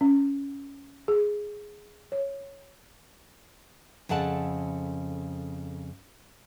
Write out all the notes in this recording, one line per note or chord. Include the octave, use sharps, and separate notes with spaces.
C#4
G#4
C#5
F2 C#3 A4 F#5 A5